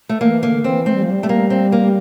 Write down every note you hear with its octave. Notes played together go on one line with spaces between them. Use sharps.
A3
E3 A#3
D3 A#3
E3 C4
A3 C4
G3
F3
G3
A3
A#3
C4
A#3